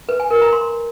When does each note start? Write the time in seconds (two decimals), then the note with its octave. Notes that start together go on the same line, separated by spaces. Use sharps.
0.09 B4
0.20 G#5
0.31 A#4
0.42 A#5
0.53 C6